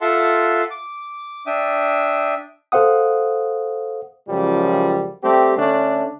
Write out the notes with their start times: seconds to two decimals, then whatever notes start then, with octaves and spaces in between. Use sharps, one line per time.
0.01 F4 A4 E5 F#5 A5 C6
0.71 D6
1.47 D4 E5 G5 D#6
2.72 A4 C5 F5 F#5 D#6
4.27 C#2 F#2 F3 G3
5.22 G3 A3 C4 G4
5.57 D3 A3 C#4 D4